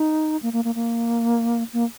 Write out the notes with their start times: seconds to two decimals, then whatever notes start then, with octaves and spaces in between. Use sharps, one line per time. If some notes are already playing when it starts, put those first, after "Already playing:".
Already playing: D#4
0.43 A#3
0.53 A#3
0.64 A#3
0.75 A#3
1.73 A#3